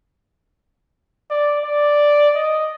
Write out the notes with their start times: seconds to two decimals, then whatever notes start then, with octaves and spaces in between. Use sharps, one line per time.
1.30 D5
1.64 D5
2.35 D#5